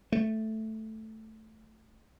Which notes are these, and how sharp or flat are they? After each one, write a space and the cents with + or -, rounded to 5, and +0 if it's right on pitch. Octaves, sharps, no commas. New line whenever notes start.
A3 +0